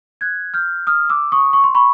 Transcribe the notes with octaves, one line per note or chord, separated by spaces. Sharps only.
F#6 G#6
F6 G6
D#6 F6
D6 E6
C#6 D#6
C#6
C6
B5 C#6